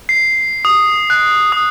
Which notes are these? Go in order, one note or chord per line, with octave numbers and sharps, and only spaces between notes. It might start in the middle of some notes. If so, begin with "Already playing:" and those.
C7
D#6
F#6
D#6